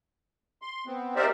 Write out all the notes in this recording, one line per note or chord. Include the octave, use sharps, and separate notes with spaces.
C6
B3 C4
D#4 G4 A#4 C5 D5 E5